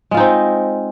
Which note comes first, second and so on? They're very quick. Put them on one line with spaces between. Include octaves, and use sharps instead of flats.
G#3 F4 D#4 C4